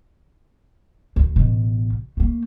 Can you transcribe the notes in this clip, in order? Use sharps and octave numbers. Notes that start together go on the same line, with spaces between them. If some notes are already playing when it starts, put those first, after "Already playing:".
D2
A1 B2
A3 A#3